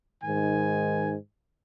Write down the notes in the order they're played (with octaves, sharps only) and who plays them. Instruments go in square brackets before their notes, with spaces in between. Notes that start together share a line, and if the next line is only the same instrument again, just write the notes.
[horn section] G#2 D#3 G#5